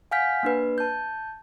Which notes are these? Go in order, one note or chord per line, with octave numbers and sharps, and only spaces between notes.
F5 F#5 G#5 F6 G6 B6
A#3 D4 B4
A5 G6